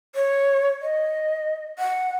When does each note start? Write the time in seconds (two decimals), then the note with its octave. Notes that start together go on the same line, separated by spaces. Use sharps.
0.15 C#5
0.82 D#5
1.79 F#5